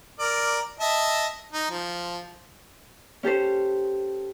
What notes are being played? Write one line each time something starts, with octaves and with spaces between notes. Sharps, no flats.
A#4 D5
D#5 E5 A5
D#4
F3
C#4 G4 A4 C5